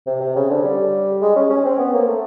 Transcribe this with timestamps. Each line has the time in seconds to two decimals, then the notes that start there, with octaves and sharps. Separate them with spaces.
0.07 C3
0.21 C3
0.36 C#3
0.50 D3
0.64 G3
1.22 G#3
1.36 C#4
1.50 C#4
1.65 C4
1.79 B3
1.93 A#3
2.08 A3